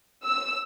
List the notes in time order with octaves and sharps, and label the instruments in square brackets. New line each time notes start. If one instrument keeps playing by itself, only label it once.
[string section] E6